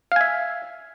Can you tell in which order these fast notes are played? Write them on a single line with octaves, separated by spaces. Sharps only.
F5 G#5 E5